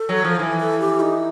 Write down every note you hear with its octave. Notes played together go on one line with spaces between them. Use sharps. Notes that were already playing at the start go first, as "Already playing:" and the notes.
Already playing: A4
F#3
F3
E3
A4
G4
D#4